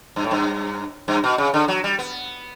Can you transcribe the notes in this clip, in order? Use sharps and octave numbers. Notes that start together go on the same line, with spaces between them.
G2
A2
G2
G2
B2
C#3
D3
F#3
G3
B3